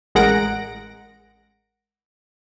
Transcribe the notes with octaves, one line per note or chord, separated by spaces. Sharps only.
A1 G#3 A#4 F#5 A#6 D7